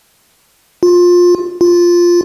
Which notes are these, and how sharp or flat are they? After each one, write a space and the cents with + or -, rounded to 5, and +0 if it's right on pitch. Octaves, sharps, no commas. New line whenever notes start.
F4 +20
F4 +0